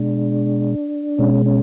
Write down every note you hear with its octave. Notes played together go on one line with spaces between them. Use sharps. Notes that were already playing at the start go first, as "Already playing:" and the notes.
Already playing: B2 G#3 D4
B2 G#3 C#4
C#4